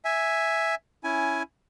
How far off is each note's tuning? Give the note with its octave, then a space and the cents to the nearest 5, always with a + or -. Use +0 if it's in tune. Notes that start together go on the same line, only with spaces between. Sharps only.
E5 +0 G#5 +0
C#4 +0 E4 +0 G#5 +10